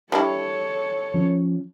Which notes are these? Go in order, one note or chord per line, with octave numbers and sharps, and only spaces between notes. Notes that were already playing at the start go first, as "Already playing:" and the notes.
G3 D4 E4 A4 C#5
F3 C#4